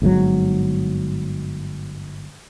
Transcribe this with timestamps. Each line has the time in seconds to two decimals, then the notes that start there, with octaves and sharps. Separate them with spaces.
0.02 G1 G#2 B2 F#3